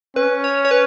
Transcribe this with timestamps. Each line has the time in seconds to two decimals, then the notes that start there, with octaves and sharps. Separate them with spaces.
0.16 C#4 B4
0.44 C#5
0.65 C#5
0.71 B4